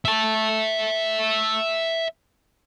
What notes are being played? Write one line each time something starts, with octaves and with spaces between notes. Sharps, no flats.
E5 A5